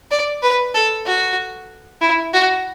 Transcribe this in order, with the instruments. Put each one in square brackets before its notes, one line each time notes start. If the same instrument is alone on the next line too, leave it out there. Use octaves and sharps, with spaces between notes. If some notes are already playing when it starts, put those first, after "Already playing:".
[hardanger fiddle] D5
B4
A4
F#4
E4
F#4